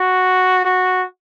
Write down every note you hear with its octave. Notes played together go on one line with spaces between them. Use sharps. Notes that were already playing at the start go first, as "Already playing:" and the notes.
Already playing: F#4
F#4